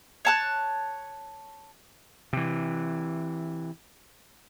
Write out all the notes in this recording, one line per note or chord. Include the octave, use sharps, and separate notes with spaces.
C#5 A5 F#6
C3 E3